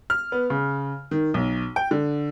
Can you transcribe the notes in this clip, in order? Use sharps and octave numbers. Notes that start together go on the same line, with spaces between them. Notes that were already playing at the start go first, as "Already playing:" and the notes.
F6
B3
C#3
D#3
B1
G5
D3